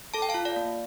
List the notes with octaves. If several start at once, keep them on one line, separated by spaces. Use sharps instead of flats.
A4 A5
G5
F5 A5
F4
D5 F5
A#3